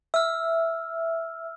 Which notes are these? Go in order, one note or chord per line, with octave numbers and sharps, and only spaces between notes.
E5 E6 F6